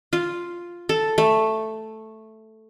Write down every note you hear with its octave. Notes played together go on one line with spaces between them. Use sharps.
F4
A4
A3